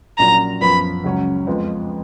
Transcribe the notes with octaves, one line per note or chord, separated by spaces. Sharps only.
A#1 A#2 F#3 C#4 A#5
F#2 F3 B3 B5
C#2 C#3 F#3 C#4
F2 F3 G#3 B3